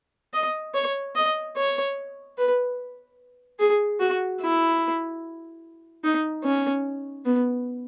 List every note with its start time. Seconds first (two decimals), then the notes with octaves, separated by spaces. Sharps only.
0.33 D#5
0.74 C#5
1.15 D#5
1.57 C#5
2.38 B4
3.59 G#4
4.00 F#4
4.41 E4
6.04 D#4
6.44 C#4
7.25 B3